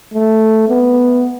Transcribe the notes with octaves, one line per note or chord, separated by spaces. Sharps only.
A3
B3